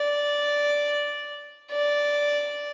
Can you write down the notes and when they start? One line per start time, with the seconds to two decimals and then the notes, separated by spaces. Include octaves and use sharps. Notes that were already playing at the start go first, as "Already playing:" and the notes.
Already playing: D5
1.71 D5